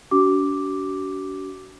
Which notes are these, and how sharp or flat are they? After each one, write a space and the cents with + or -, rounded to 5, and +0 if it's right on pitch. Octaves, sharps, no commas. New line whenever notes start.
D4 -45 F#4 +40 D6 +0